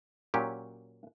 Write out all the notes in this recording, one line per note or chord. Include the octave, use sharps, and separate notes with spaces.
A#2 F#3 C#4 G4